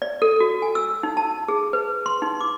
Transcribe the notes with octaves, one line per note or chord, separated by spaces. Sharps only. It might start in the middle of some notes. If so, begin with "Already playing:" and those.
D5
A4
F#4
G#5
E6
D#4
A5
G#4
B4
C6
D#4
D6